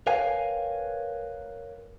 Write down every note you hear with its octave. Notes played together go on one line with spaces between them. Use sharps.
A#4 B4 C#5 F5 G5 G#5